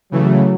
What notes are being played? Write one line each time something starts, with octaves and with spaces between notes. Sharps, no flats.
C#3 E3 F#3 A3